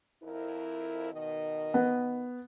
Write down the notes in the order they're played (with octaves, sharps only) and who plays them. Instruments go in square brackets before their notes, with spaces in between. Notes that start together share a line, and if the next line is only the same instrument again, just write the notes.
[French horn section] F2 E4 A#4
B2 D#3 D#5
[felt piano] B3